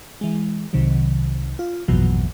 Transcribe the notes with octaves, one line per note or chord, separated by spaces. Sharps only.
E3 G#3
C2 C3 D#3 F#3
F4
A#1 F2 G#2 B2 E3 F#3